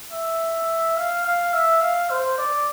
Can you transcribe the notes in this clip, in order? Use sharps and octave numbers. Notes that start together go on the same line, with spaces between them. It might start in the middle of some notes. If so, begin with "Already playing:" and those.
E5
F5
F5
E5
F5
C5
D5